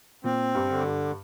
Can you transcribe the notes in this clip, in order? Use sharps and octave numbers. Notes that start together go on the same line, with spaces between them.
A#2 C4
G2
D3
G2